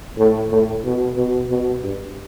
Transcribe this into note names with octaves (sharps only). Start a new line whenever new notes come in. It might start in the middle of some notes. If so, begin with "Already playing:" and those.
A2
A2
B2
B2
B2
G2